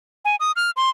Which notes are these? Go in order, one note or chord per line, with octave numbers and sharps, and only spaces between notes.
G#5
D#6
F6
C6